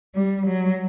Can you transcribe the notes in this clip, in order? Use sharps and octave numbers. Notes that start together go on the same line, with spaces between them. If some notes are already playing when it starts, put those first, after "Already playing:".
G3
F#3